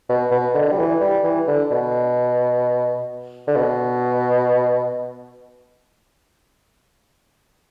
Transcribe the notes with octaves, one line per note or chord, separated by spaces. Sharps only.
B2
B2
D3
G3
E3
G3
E3
D3
B2
D3
B2